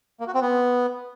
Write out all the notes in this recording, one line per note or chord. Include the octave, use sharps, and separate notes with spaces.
A#3
F#4
C4
B3